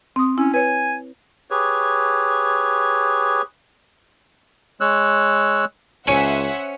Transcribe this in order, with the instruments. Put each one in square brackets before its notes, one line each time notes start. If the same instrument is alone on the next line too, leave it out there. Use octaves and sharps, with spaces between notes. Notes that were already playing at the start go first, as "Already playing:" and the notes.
[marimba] C4 D#6
[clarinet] C#4 [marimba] E4
[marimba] B4 C#5 [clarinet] G#5
[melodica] G4 G#4 B4 C#5
[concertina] G#3 C#5 E6 F#6
[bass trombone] C#2 [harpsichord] C#4 [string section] C5 E5 F#5 [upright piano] G#5 C#7 D#7